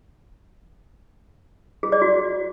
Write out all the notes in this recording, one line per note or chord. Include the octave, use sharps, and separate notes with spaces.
G#4
D5
F#4